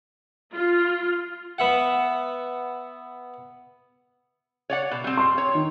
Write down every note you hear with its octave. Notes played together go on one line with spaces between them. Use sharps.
F4
B3 E5 F#5
C#5 D5 F#5
B2
G3 C4
C6
C#5
D#3